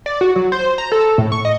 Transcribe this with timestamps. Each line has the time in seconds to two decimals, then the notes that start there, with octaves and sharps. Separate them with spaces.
0.06 D5
0.21 F#4
0.36 F#3
0.52 C5
0.78 A#5
0.92 A4
1.18 A2
1.32 C#6
1.45 D#5